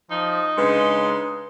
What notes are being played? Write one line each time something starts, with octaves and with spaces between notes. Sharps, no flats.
F3 D#4
C#3 G#3 D4 B4 C6 C#7